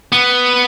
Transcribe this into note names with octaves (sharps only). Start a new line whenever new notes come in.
B3